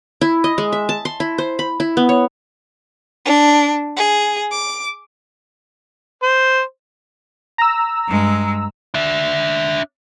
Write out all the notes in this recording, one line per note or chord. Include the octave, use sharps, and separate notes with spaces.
E4
D#5
G#3
E5
A5
C6
E4
C5
B5
E4
B3
C#5
D4
G#4
D6
C5
A#5 E6
G2 G#3
D4 E5